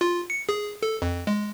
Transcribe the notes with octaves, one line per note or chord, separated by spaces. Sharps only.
F4
C#7
G#4
A4
F2
G#3